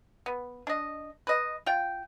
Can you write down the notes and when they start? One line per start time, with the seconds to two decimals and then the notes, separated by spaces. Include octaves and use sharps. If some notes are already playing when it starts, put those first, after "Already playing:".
0.26 B3
0.67 D4 D#5
1.27 B4 D#5
1.66 F4 G5